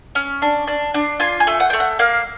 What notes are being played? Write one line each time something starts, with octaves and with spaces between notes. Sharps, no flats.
C#4
D4
D4
D4
F4 G#5
G#5
A3
F#5
A3 G5
F#5
A#3 F5